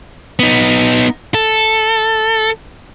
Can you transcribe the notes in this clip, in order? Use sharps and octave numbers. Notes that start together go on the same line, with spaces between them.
B3 D#4
A4